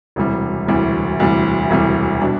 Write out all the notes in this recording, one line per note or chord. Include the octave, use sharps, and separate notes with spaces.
E1 D2 C3 E3 G3
E1 D2 C3 E3 G3
E1 D2 C3 E3 G3
E1 D2 C3 E3 G3
B2 G3 D4